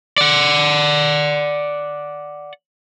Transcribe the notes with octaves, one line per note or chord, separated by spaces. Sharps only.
D5 F#5